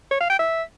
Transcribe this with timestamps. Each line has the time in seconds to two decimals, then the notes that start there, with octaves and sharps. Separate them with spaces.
0.11 C#5
0.21 F5
0.30 G5
0.39 E5